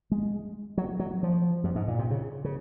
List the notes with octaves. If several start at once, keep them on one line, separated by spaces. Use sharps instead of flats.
G#3
F#3
F#3
F3
F#2
G#2
A#2
C3
C#3
C#3